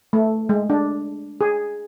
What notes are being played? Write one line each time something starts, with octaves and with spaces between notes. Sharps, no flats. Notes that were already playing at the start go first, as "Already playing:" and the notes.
A3
G#3
D4
G#4